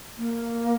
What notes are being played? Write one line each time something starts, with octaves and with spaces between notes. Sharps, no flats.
A#3